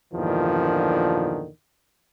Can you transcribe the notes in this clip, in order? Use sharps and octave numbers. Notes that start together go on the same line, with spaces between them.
E2 G2 A#2 D3 D#3 F3